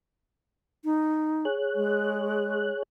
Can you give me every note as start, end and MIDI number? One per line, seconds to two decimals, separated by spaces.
0.85 1.45 63
1.45 2.83 68
1.45 2.83 73
1.45 2.83 90
1.75 2.70 56